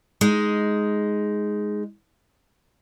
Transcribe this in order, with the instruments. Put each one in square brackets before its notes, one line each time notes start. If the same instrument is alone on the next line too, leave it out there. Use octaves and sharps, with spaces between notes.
[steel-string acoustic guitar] G#3 D#4